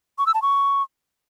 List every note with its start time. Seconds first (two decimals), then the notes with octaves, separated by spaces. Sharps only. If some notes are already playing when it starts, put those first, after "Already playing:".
0.19 C#6
0.26 E6
0.34 A5
0.42 C#6